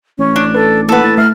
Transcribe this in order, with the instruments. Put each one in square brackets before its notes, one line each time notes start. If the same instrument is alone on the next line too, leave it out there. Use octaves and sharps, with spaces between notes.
[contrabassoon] A1 [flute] C#4
[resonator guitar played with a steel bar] D4
[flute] A4 [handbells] B4
[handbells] A#3 E4 F#5 [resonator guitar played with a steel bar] A4 B4 [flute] A5
[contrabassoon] A2 [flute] A6
[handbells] A3 E5 C7 [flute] F6